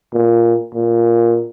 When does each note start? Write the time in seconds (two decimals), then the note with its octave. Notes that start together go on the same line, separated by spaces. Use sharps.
0.13 A#2
0.74 A#2